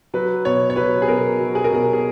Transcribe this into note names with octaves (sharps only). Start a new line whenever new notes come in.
F#3 B4
B2 C#5
C#5
F#3 B4
G#4
B2 A#4
F#3
G#4
A#4
B2 G#4
G#4